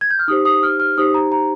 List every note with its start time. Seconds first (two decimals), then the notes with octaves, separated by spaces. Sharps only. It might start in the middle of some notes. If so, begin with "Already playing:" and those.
0.01 G#6
0.11 G6
0.19 F6
0.28 D#4 G4 C5 D#6
0.45 D#6
0.63 F6
0.80 F6
0.97 D#4 G4 C5 D#6
1.14 A#5
1.32 A#5